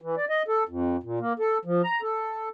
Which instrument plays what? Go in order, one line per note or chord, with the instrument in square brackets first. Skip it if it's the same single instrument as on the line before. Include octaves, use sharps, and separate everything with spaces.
[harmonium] E3
D5
D#5
A4
F2
A#2
A#3
A4
F3
A#5
A4